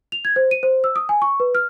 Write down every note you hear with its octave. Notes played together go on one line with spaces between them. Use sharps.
F7
G#6
C5
D#7
C5
E6
D#6
G#5
C#6
B4
F6